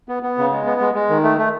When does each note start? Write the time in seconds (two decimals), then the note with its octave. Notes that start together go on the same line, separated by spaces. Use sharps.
0.09 B3
0.23 B3
0.38 C#3
0.52 G#3
0.66 B3
0.81 G#3
0.95 G#3
1.09 D#3
1.24 A3
1.38 A3